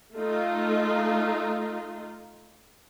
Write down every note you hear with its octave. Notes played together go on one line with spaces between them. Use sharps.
A3 D#4 F4